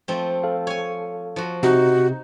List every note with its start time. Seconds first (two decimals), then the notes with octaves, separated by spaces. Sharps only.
0.08 F3 A3 C4
0.44 A4 F5
0.67 C#5 G#5
1.36 F3 F#4
1.63 C3 D#4 F#4